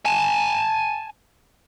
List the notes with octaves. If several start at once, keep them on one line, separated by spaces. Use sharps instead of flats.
G#5 A5